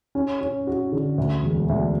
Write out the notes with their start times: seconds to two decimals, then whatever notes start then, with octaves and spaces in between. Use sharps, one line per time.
0.15 C#4
0.41 C#4
0.67 F#4
0.92 D3
1.18 D2
1.43 E1
1.69 D2